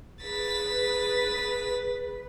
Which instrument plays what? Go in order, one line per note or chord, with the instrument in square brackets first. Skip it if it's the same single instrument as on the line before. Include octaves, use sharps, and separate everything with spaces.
[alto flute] G#4 [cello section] B4 [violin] A6 B6